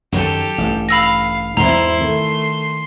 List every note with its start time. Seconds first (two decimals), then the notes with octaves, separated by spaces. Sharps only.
0.12 F#2 D#3 F#3 G4 A4
0.58 A1 G2
0.89 F5 B5 E6 A#6
1.57 E2 G#2 C4 E4 A#5 C6
2.02 D#3 A3